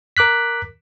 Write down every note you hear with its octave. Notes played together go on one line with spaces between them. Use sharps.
A#4 D6 F#6 B6